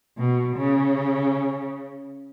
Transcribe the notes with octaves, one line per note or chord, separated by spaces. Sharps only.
B2
C#3